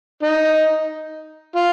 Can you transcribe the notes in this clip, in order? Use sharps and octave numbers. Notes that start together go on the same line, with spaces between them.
D#4
F4